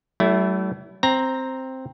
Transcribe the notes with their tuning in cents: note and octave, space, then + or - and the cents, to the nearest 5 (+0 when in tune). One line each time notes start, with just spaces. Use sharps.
F#3 +45 A3 -5 E4 +0
C4 +0 A#5 +0